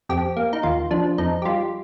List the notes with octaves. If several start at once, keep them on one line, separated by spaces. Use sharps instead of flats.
F2 G4
A#3
D#4
D#2 F4
F3 D4
F2 D#4
G4
G3 F4